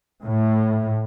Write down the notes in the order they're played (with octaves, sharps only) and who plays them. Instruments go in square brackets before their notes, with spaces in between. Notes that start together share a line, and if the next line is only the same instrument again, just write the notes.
[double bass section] A2